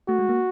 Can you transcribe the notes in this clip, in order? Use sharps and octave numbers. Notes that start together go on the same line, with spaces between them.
A3 F#4
G#3
A#3